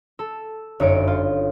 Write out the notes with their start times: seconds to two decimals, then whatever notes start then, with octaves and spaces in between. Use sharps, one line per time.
0.19 A4
0.80 G1 F#2 D#4 C#5 D#6 D7
1.08 F4